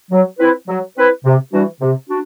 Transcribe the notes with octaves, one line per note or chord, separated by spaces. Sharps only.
F#3
C4 E4 B4
F#3
C4 E4 B4
C3
E3 G3 D4 F#4
C3
D4 F#4